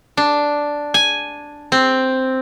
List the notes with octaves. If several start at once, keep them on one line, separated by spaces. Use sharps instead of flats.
D4
G#5
C4